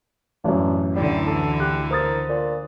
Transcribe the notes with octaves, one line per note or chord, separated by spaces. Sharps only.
A1 F#2 D4
D2 D3 E3 G3
A4
G4 F#6
A#4 C5 D#6 A6
A#2